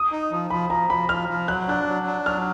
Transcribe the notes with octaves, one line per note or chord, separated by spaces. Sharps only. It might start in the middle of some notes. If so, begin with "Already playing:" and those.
Already playing: D#6
D#4
F3
F3 B5
F3 A#5
F3 B5
F3 F6
F3
F#3 F#6
D4 F#6
F#3
D4
F#3 F6